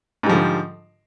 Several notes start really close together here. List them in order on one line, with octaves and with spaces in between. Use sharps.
G#2 G3 F3 D3